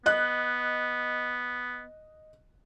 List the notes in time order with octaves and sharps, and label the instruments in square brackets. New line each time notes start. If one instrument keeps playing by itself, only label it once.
[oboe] B3 [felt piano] D#5 F#6